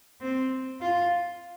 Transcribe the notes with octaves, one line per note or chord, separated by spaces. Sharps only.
C4
F4